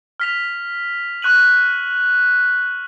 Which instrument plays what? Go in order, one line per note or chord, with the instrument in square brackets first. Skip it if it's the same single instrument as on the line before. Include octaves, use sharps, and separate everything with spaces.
[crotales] F6 B6 F7
C#6 F#6 D#7 F#7